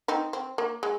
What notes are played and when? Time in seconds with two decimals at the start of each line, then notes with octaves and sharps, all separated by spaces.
0.08 C4 D#4
0.33 C4
0.58 A#3
0.83 G#3